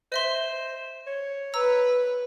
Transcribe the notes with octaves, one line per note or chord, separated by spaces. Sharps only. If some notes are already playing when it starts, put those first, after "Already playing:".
C5 D#5 E5 C6
C#5
B4 A#5 E6